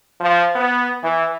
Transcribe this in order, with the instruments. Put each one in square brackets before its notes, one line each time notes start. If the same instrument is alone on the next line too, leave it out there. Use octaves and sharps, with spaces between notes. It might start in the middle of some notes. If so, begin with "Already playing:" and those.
[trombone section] F3
B3
E3